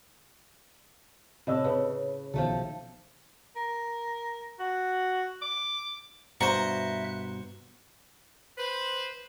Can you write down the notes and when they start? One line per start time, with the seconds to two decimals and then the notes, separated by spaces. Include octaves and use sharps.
1.47 A2 C3 D4 D#5 E6
1.64 C#3 B4
2.34 B1 D#3 F3 A3 A4
3.56 A#4
4.59 F#4
5.42 D6
6.41 G2 B2 C5 E5 A#5 C#6 F#6
8.58 B4 C5